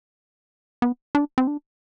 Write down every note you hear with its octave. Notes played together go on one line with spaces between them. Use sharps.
B3
D4
C4
D4